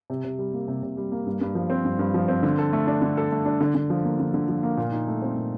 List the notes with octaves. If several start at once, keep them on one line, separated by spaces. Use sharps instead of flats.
C3
C3
G3
A#3
C3
C3
G3
A#3
G2
G2
F3
C4
G2
G2
F3
C4
D3
A4
A3
D4
D3
A4
A3
D4
D3
D3
F3
A#3
D3
D3
F3
A#3
A#2
D#4
A3
C4
A#2